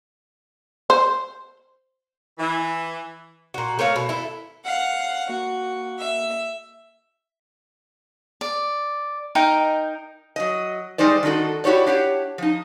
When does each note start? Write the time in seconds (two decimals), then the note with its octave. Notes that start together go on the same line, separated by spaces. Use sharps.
0.90 C5
2.39 E3
3.54 A#2 F#4
3.79 A3 A#4 C#5 F5
3.96 B2
4.09 E4 A4
4.63 F5 F#5
5.29 A#3 F#4
6.00 E5
8.41 D5
9.35 D#4 A#4 D#5 G5
10.36 F#3 D#5
10.98 G3 G#3 D#4 C5 D5
11.23 D#3 D4 D#4 F#4 A4
11.64 E4 F#4 G4 C#5 D5
11.86 D4 G4 C#5 F#5
12.38 F3 D#4